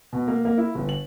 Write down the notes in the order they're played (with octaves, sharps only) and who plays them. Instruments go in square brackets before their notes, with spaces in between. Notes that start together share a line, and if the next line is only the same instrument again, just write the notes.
[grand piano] B2
A#3
A#3
E4
G1
F#7